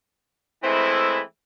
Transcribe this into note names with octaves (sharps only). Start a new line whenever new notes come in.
E3 G#3 A3 C4 E4